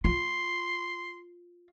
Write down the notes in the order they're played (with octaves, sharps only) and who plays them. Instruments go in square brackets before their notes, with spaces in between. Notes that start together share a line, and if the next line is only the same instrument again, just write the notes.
[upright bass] F4 [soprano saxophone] C6